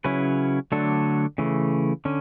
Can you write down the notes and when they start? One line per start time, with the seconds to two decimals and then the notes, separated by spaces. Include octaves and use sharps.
0.04 C#3 F#3 C#4 E4 B4
0.72 D3 F#3 A3 D4 A4
1.38 C#3 E3 A3
2.05 D3 C#4